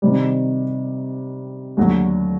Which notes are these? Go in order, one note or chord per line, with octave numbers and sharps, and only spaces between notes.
C3 D#3 G3
D#2 D3 F#3 A3